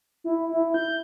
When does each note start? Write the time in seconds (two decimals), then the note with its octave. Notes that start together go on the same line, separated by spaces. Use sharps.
0.24 E4
0.52 E4
0.74 G6